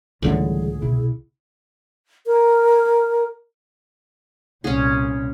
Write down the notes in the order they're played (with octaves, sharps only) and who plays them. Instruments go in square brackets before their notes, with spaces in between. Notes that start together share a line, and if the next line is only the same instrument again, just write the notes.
[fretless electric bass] C#2 A2 D3 [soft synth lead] E3 [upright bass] G3 [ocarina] G#4
[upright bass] C2 B2 [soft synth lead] E4
[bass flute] A#4
[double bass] C2 A#2 [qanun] C#4 G#4